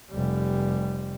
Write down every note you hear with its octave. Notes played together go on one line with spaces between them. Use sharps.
F1 G3